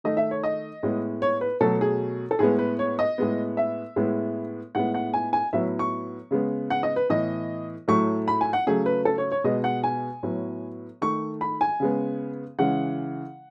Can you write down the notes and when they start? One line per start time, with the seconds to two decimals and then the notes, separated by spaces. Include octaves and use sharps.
0.04 D#3 A3 D#5
0.17 E5
0.31 C#5
0.44 D#5
0.83 A2 G#3 B3
1.22 C#5
1.41 B4
1.61 B2 F#3 A3 A4
1.81 G#4
2.31 A4
2.39 A2 G#3 B3 G#4
2.59 B4
2.79 C#5
2.99 D#5
3.18 A2 G#3 B3
3.57 E5
3.96 A2 G#3 B3
4.75 A2 G#3 B3 F#5
4.94 F#5
5.14 G#5
5.33 G#5
5.53 A2 F#3 B3 E5
5.79 C#6
6.31 C#3 G#3 B3
6.70 F#5
6.83 D#5
6.96 B4
7.09 A2 E3 B3 D#5
7.88 A2 F#3 A3 C#6
8.28 B5
8.41 G#5
8.53 F#5
8.67 C#3 F#3 A3 G#4
8.86 B4
9.05 A4
9.18 C#5
9.32 C#5
9.44 B2 G#3 B3 D#5
9.64 F#5
9.84 G#5
10.23 A2 F#3 B3
11.02 D#3 A3 C#6
11.41 B5
11.61 G#5
11.80 C#3 G#3 B3
12.59 C#3 E3 G#3 F#5